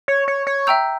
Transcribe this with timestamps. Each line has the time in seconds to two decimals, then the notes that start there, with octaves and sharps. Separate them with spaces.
0.08 C#5
0.28 C#5
0.47 C#5
0.67 E5 G5 A#5 E6 G6